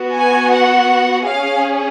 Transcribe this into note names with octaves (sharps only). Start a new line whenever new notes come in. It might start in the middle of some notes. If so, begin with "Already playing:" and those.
Already playing: B3 F#4
G#5
F#5
C#4 G#4 F5